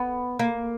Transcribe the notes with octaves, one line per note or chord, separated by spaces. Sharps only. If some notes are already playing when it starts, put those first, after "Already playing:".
Already playing: B3
A#3